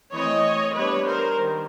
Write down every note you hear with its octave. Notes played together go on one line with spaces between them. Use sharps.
E3 A3 C4 C#5 D#5
G3 B3 D4 B4 C#5
A#4 C5
D#3 G3